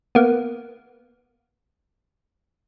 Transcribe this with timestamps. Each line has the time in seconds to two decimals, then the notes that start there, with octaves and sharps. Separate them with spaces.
0.15 A#3 B3